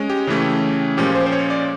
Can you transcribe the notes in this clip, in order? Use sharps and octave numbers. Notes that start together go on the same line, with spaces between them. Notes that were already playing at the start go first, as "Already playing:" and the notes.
Already playing: G#3 C#4
G4
C#3 E3 A3 C#4
A#2 F3 G#3 C#4 G4
C5
C5
C#5
D5